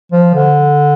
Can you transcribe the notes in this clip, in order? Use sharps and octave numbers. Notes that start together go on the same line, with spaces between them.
F3
D3